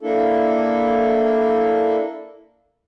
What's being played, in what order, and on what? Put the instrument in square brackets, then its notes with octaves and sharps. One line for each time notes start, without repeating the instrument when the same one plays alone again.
[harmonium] A#3 D4 E4 A4